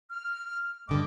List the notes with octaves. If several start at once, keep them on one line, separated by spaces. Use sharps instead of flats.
F6
G2 D3 A3 D#5 D6